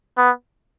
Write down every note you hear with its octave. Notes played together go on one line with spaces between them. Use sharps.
B3